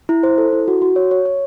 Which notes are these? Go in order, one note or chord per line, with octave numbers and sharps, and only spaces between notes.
E4
C5
A4
E4
F#4
F#4
C#5
C#5
C#5